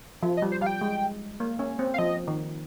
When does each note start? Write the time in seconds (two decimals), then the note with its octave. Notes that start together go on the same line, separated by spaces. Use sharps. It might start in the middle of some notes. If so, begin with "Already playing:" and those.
0.23 F3
0.37 D#5
0.42 G3
0.52 C5
0.61 G3 F5
0.67 G5
0.81 G#3
1.40 A#3
1.59 C#4
1.79 C4
1.94 F5
1.99 F3 D#5
2.28 D#3